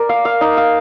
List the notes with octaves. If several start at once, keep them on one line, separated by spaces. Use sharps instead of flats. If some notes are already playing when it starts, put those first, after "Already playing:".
Already playing: A#4 D5
F5
F5
D#4
F5